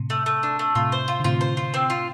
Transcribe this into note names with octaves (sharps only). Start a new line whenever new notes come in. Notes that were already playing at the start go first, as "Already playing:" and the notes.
Already playing: A2 C3
A3
A3
D4
A3
A2 C3 F4
C5
F4
D3
A2 C3 F4
C5
F4
C4
F4